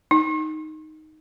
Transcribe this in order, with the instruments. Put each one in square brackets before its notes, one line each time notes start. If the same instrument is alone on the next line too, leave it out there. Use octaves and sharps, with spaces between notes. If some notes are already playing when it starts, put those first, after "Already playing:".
[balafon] D#4